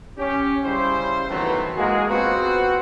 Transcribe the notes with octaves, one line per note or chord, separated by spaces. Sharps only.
C#4 G4
C#3 G3 E4 C5
D#3 E3 F#3 A3 B3 C4
G#3 A#3 F#4 G#4
B3 C4 F4 F#4